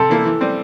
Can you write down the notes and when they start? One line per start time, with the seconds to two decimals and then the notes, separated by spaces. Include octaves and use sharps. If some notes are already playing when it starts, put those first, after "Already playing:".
Already playing: C3 A4
0.09 E3 A#3 E4
0.25 E3
0.41 G3 C4